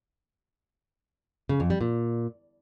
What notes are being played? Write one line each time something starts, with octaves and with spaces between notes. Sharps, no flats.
C#3
F2
G3
A#2